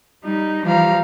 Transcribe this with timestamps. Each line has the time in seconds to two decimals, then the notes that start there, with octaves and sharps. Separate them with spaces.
0.22 G3 D#4
0.64 E3 F3 G3 F5 A#5